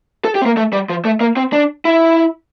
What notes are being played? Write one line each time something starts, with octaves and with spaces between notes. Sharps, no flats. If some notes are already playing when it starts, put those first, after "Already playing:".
A4
G4
C4
A#3
A3
G3
F3
A3
A#3
C4
D4
E4